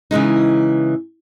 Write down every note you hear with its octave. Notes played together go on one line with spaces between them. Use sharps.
C#3 E3 G#3 D#4